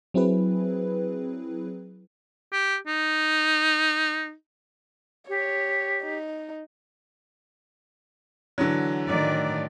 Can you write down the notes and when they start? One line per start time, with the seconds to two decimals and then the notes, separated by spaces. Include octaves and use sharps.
0.14 F#3 C4 E4 G#4 B4
2.53 G4
2.87 D#4
5.29 G4 C#5
6.02 D#4
8.58 D3 E3 F#3
9.07 A2 D#3 D5